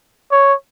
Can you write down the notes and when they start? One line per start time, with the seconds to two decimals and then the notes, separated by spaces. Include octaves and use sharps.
0.32 C#5